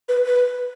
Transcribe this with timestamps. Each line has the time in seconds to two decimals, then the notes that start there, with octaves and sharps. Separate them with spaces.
0.09 B4
0.26 B4